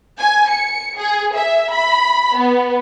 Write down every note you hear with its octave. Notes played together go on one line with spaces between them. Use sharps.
G#5
C#7
G#4
E5
B5
B3